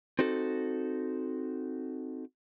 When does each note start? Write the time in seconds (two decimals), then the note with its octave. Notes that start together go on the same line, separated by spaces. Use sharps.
0.19 C4 D#4 F#4 A4